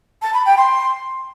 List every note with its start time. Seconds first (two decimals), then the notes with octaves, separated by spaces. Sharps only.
0.22 A5
0.34 B5
0.46 G5
0.58 C6